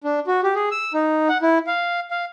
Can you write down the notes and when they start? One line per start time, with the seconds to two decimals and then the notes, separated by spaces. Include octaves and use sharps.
0.04 D4
0.27 F#4
0.43 G4
0.55 G#4
0.71 E6
0.94 D#4
1.29 F#5
1.42 E4
1.67 F5
2.11 F5